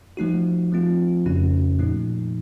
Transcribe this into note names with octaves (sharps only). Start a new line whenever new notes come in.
F3 A3 D#4 F#4
F3 A3 C4 F4
F2 C#3 A3 C#4 F#4
A#2 F3 A3 D#4